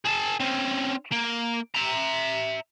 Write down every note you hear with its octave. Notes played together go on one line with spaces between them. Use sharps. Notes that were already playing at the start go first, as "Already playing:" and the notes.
G#4 A5
C4 C#4
A#3
E5 A#5